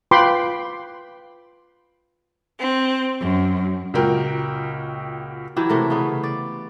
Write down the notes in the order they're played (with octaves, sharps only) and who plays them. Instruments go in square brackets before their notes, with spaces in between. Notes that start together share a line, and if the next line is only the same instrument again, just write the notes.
[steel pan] F4 B4 G5 B5 C6 D6
[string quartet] C4
F#2
[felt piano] C#2 A#2 F#4 A#4 G5
[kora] E3 F#3 E4 G4
C3 A3 A#4
C#3 B3
D5